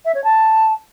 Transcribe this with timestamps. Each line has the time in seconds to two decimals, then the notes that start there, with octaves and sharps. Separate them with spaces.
0.05 E5
0.15 C#5
0.24 A5